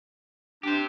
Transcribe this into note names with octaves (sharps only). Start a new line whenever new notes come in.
D4 G4 C5